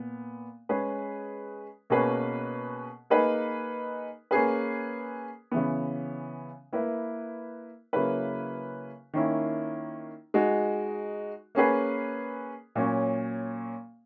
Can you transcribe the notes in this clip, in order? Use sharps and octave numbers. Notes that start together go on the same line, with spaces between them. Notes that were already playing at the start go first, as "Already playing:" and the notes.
Already playing: A#2 B3
G#3 C#4 G#4 B4
B2 A#3 C#4 G#4 B4
A#3 D#4 G#4 B4
A#3 C#4 G#4 B4
C#3 E3 B3
A#3 E4 B4
C#3 F#3 A#3 E4 B4
D#3 A#3 C#4 E4
G#3 D#4 F#4
A#3 C#4 G#4 B4
A#2 F#3 C#4